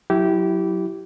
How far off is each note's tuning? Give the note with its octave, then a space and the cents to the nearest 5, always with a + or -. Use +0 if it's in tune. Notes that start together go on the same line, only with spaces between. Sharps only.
F#3 +0 E4 +0 G4 -20